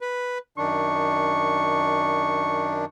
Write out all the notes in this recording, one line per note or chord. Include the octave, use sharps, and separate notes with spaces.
B4
F#2 D#3 D4 C#6